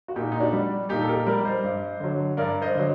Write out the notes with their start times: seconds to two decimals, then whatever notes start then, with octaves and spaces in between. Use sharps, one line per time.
0.08 F#4
0.16 A#2 D#4 G4
0.32 D#4
0.40 D4 F#4
0.53 G3
0.89 A#2 D#4 G4
1.01 A4
1.08 G4 A#4
1.26 G3 A#4 D5
1.44 C5 D#5
1.63 G2
2.00 D3 F#3
2.37 G2 A#4 D5
2.62 C5 D#5
2.74 D3 F#3